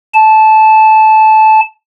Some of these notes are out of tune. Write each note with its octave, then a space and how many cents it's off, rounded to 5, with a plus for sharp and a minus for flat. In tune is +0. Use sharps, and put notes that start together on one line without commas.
A5 -15